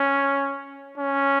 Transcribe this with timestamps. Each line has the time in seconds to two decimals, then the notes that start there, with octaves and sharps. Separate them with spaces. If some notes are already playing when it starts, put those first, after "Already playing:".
Already playing: C#4
0.98 C#4